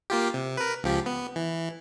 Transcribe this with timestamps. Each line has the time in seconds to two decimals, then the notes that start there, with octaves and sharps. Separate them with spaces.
0.10 A#3 F4 G4
0.34 C3
0.57 A#4 B4
0.84 C#2 F3 G4
1.06 B3
1.36 E3